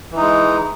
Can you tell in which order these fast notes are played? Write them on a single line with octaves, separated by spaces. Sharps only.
E3 D#4 G#3